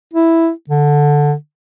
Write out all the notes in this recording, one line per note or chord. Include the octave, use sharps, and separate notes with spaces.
E4
D3